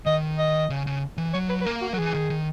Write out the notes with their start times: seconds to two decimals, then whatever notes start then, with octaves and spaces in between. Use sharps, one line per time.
0.06 D#3 D#5
0.38 D#5
0.70 C#3
0.87 C#3
1.17 E3
1.34 F#3 C#5
1.49 B4
1.62 B4
1.65 A#3 A#4
1.81 F#4
1.93 F#3 A#4
1.97 E3 G#4
2.14 D#3
2.30 D#3